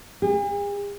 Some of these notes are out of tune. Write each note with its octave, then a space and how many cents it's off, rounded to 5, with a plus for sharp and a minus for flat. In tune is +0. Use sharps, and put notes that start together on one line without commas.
G#4 -45